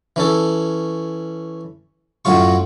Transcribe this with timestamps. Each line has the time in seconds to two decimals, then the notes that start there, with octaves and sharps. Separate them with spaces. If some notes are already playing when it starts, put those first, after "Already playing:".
0.16 E3 C#4 A4
2.25 F#2 A2 F#3 F4 C#6